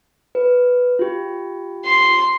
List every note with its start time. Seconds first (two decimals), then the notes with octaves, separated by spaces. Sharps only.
0.35 B4
0.99 F4 G4
1.86 C6